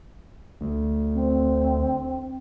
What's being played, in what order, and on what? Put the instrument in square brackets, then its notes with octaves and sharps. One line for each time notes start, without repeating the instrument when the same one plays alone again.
[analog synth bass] D2
[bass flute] C4